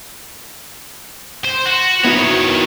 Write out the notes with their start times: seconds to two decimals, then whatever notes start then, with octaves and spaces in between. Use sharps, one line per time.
1.44 C5
1.65 F#4
2.04 D#3 B3 E4 F#4 C#5